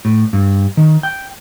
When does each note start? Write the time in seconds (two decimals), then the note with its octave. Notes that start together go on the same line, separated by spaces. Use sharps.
0.05 A2
0.33 G2
0.77 D#3
1.03 G5